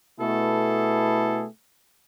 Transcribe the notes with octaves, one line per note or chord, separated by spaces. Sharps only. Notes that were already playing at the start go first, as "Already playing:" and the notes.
B2 A3 B3 E4 G#4 A4